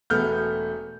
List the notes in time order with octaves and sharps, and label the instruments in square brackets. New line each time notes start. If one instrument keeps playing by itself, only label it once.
[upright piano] E1 A3 B3 F6 G6